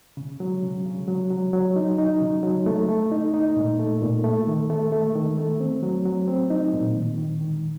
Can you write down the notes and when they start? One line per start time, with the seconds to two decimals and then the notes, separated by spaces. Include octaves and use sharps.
0.17 C#3
0.40 F#3
0.63 C#3
0.86 C#3
1.08 F#3
1.31 F#3
1.53 F#3
1.76 D#4
1.98 D#4
2.21 C#3
2.43 F#3
2.66 A3
2.88 A3
3.11 D#4
3.34 D#4
3.57 A#2
3.79 A3
4.02 A#2
4.24 A3
4.47 D#3
4.70 A3
4.92 A3
5.15 D#3
5.38 A3
5.60 C4
5.83 F#3
6.05 F#3
6.28 C4
6.50 D#4
6.73 A#2
6.95 D#3
7.18 D#3
7.41 D#3